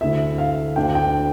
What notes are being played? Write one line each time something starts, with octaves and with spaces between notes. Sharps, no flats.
D2 D3 A3 E4 E5
F5
D2 D3 A3 D4 G5
G5